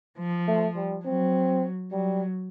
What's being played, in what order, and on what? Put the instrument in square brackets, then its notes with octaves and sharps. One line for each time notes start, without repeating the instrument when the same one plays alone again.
[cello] F3
[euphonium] A3
G3
[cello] F#3 [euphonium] C4
[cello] F#3 [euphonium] G3